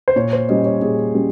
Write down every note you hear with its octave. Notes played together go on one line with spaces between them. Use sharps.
C5
A#2 C#5
C5
G3 C#4 D#5
C#5
A#2 G#4
G3 C#4